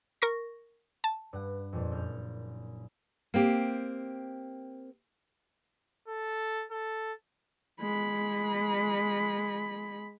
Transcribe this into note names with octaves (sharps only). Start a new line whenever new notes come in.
A#4 C#6 A#6
A5
G2 F#5
F2 A#2
F#1 F6 G6
A#3 C4 G4
A4
A4
G#3 B5